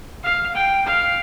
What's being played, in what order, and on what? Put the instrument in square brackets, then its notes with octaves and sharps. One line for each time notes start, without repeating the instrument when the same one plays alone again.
[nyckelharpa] F5
G5
F5